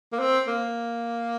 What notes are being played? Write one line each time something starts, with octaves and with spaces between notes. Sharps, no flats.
A#3
C4
A#3